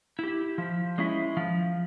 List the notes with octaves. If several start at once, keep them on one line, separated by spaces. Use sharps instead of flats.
E4 G4
F3
G#3 C#4 E4
F3